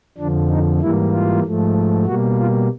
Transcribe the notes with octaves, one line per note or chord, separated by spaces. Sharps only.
F2 D3 F3 D4
D#4
G#2 E3 G3 A#3 E4
F4
G#2 F3 A3
B2 G3 A#3 F#4
F4